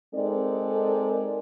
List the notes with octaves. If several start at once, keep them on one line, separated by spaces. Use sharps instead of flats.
G#3 C4 D#4 A4 A#4 D5